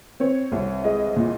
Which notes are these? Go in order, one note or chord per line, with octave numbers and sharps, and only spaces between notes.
C4 C#5
C2
G#3 D#5
A#2